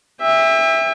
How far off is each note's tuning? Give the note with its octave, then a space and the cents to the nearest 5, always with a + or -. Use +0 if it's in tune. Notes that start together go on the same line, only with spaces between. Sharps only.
E5 +0 G5 +40